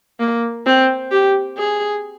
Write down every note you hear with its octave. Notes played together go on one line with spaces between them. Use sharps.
A#3
C4
G4
G#4